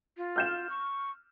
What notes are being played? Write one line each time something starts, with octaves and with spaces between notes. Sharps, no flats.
F4
F6 G6 E7
C#6